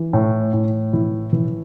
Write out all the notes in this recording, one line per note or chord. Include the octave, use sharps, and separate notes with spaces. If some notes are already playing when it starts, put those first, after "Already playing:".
Already playing: E3
A2
A2
E3 E4
E3